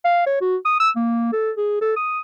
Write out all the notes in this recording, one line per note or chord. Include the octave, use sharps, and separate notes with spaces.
F5
C#5
F#4
D#6
E6
A#3
A4
G#4
A4
D#6